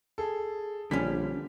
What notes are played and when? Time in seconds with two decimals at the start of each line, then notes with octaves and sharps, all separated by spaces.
0.18 G#4 A4
0.91 A#1 D3 G3 C#4 B6